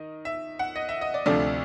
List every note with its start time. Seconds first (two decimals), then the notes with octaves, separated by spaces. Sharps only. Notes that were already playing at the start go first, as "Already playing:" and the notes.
Already playing: D#3 D#5
0.25 E5
0.59 F#5
0.76 D#5
0.89 E5
1.01 D#5
1.14 D5
1.26 D2 C3 F3 A3 D4 D5